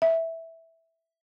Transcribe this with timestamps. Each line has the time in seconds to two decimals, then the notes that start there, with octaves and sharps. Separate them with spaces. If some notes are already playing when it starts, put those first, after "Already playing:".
0.02 E5